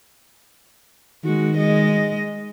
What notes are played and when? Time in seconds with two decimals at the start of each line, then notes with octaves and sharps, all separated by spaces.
1.24 D#3 G#3 F#4
1.57 G#3 D#5